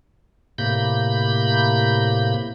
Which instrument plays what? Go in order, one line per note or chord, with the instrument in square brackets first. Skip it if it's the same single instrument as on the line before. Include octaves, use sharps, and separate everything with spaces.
[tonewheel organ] A2 C3 A#3 B5 G6